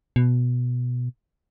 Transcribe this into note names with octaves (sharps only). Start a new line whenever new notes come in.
B2